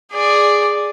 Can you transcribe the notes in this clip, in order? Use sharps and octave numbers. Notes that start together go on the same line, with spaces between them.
G#4 D5